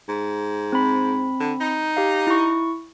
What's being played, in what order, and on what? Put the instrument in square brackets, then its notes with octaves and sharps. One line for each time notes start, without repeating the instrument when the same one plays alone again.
[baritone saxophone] G#2
[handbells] C4 B5
[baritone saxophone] D3
D#4
[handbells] G4 F5
E4 C#6